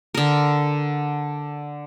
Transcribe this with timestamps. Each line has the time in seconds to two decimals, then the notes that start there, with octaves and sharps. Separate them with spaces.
0.14 D3 A#4